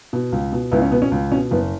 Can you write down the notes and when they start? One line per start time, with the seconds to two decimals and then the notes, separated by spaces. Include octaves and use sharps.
0.13 B2
0.32 C#2
0.52 B2
0.71 C#2 B3 E4
0.82 C#4
0.91 B2 B3
1.02 C#4
1.12 C#2
1.32 B2 C#4
1.51 F#1 B3